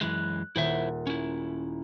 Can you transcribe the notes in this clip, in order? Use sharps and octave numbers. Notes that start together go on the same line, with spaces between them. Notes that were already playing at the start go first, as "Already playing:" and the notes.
F#2 E3 G#3 F#6
D#1 E4 C5 E5
C#4 E4